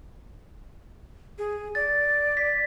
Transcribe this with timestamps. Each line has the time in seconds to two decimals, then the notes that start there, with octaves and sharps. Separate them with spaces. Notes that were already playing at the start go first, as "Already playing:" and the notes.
1.38 G#4
1.75 D5 A6
2.37 B6